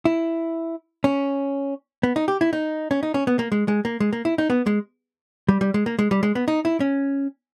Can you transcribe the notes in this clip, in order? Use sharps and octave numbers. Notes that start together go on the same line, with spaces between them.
E4
C#4
B3
D#4
G4
E4
D#4
C#4
D#4
C#4
B3
A#3
G#3
G#3
A#3
G#3
A#3
E4
D#4
B3
G#3
G3
G3
G#3
A#3
G#3
G3
G#3
B3
D#4
E4
C#4